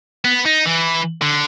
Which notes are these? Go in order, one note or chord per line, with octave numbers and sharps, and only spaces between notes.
B3
D#4
E3
D3